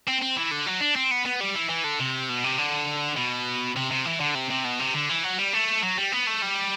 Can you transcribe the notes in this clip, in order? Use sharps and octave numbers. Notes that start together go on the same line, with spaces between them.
C4
C4
E3
D3
F#3
D4
C4
B3
B3
G3
E3
E3
D3
C3
B2
C3
D3
B2
C3
C3
E3
D3
C3
C3
B2
C3
D3
E3
F#3
G3
A3
F#3
G3
B3
A3
G3